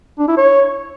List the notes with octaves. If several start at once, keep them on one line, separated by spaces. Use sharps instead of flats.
D4
E4
C#5